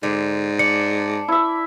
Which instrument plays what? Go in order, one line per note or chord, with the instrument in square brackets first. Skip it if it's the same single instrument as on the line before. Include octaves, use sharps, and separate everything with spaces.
[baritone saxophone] G#2 [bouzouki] D3
[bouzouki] D4 [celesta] C#7
[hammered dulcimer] E4 E5